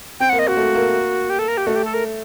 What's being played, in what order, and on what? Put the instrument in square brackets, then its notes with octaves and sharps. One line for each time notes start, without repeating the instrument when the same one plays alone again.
[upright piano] C4 [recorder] G5
[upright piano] A#3 [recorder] F#5
[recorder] D#5
[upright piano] A#3 [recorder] F#4
[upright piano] A3
A#3
[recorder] G4
A4
A#4
G4
[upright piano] A3 [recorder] F#4
[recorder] G4
A4
A#4